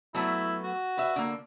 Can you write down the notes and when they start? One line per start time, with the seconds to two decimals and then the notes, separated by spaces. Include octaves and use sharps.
0.14 F#3 A3 B3 E4
0.63 F#4
0.97 B4 E5
1.16 D3 A#3